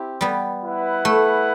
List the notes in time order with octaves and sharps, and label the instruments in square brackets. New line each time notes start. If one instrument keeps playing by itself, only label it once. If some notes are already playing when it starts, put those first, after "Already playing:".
Already playing: [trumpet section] C4 E4 G4
[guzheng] G3 B3
[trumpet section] E4 B4 F#5
[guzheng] A3